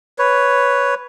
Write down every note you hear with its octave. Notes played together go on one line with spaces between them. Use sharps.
B4 C#5